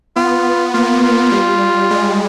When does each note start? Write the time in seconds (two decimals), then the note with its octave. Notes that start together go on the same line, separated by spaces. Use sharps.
0.16 B3 F4
0.74 A#3 F4
1.03 F4
1.32 G3
1.91 G#3